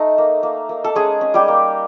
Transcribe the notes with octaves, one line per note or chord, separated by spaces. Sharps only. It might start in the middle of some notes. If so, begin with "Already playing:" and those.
Already playing: A3 D#4
A#3
A#3
A#3
A4
G#3 C#4 G#4
C#4
G3 G4
A#3